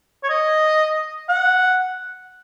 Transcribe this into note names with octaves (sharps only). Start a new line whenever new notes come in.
C#5
D#5
F#5